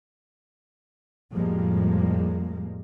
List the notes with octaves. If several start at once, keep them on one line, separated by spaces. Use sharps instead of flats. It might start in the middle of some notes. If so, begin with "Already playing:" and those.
F2 A2 F3 G3 G#3 A#3